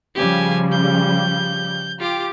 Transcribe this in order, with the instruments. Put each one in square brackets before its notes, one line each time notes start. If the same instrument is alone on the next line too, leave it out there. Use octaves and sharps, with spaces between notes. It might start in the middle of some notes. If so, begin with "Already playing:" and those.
[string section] C#3 F3 G3 [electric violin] G4 G#5
[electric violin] G6
[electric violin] F4 D6 [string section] G4